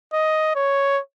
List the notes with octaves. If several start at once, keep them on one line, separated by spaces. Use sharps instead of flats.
D#5
C#5